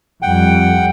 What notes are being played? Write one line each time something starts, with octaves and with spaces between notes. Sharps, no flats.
F2 G3 F#5 G5